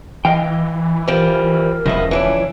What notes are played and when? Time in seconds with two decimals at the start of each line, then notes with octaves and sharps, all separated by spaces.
0.25 E3 D#5 F5 G5
1.08 F3 G3 A#4
1.86 E1 C#3 F3 B3 D#5 E5
2.11 E3 D4 E4 C#5